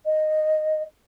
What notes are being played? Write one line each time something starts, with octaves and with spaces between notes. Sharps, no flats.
D#5